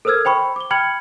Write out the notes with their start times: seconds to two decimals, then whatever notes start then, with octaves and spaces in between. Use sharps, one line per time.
0.05 A4 A#4 C5 E6 F6 G#6
0.25 C5 G5 B5 C#6
0.56 D6 G7
0.71 G5 B5 F6 G#6 C#7 F#7